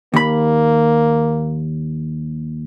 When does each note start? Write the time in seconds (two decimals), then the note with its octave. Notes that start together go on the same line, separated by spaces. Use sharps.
0.14 D#2 A#3 B5